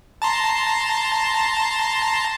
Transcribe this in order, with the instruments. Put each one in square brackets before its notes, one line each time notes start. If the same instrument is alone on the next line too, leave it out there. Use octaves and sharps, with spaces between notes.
[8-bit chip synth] A5 A#5 C6